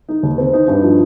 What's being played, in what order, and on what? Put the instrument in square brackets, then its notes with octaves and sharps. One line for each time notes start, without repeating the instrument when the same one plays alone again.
[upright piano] D#4
D#2
C4
D#4
G2
F3